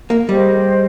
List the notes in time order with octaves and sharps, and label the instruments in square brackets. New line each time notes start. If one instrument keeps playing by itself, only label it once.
[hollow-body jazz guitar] A#3
[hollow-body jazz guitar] G3 [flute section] G#4 C5 D#5 G5